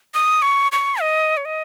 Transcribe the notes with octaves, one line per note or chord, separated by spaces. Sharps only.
D#6
C#6
C#6
D#5
C#5
D#5